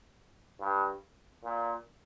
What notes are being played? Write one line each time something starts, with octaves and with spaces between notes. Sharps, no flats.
G2
A#2